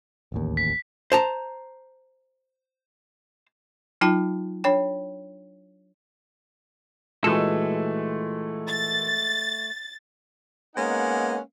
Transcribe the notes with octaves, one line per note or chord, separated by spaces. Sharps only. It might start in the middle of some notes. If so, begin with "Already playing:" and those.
D1 A1 D#2
B6
C5 A5 A#5
F#3 D#4 F4 G5 A5
D4 C#5 G5
A#2 E3 G#3 A3 F#4 A4
A6
G#3 A#3 B3 C#4 D#4 F#5